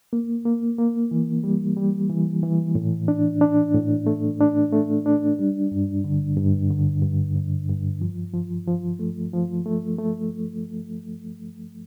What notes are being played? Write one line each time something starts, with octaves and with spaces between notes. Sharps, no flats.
A#3
A#3
A#3
E3
G3
G3
E3
E3
A2
D4
D4
A2
A3
D4
A3
D4
G3
G2
D3
G2
D3
G2
G2
G2
F3
F3
F3
A3
F3
A3
A3